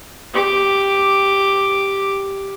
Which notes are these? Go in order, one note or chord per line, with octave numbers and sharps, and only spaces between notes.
G4 D6